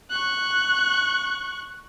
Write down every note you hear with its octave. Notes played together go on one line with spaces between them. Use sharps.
C#6 F#6